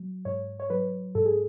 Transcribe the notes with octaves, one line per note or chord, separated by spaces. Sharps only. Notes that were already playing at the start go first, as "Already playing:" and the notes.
Already playing: F#3
G#2 C#5
C#5
F#3 B4
G#2 A4
G#4